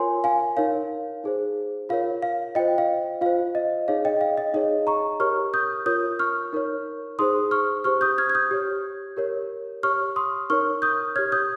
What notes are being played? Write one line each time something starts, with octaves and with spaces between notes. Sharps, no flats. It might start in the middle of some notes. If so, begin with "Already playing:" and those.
Already playing: F4 A#4 C#5 G#5 C6
F5 G#5
D#4 A#4 C#5 F5
D#4 G#4 C5
F4 A#4 C#5 F5
F5
F4 C5 D#5 G5
F5
F4 C5 F5
D#5
D#4 G#4 C#5 F5
D#5 G5
F5
D#5
D#4 G#4 C#5 D#5
A#5 C#6
G4 A#4 C#5 C#6 F6
D#6 G6
F4 A#4 C#5 D#6 G6
C#6 F6
D#4 A#4 C#5
D#4 G#4 C5 C6 D#6
C#6 F6
G4 C5 C#6 F6
D#6 G6
F6 G#6
G#6
D#6 G6
G4 C#5
G4 A#4 C#5
G4 C#5 C#6 F6
C6 D#6
D#4 A#4 C#5 C#6 F6
D#6 G6
G4 C#5 F6 G#6
D#6 G6